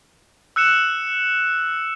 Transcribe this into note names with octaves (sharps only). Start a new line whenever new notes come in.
E6 F#6 C#7 E7